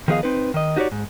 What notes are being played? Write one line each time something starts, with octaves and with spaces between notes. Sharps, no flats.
D#3 F3 B3 G#4 D#5 F5
C4 D#4 B4
D#3 D#5
D#4 F#4 G4 B4 C#5 D5
G#2